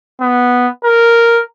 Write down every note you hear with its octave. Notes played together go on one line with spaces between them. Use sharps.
B3
A#4